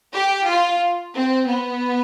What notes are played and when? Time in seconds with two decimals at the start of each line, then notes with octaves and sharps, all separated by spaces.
0.14 G4
0.48 F4
1.14 C4
1.47 B3